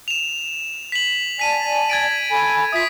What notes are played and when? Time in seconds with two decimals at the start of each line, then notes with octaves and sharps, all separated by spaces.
0.08 E7 F7
0.92 B6 F#7
1.39 D5 G#5 A5 B6 D#7
1.90 G#6 A6 D7
2.30 A4 G#5 B5
2.73 F4 E5 D#6 B6